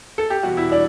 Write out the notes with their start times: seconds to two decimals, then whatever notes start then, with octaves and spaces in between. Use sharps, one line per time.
0.18 A4
0.30 G4
0.43 E2 B2 G3 F#4
0.57 E4
0.72 D4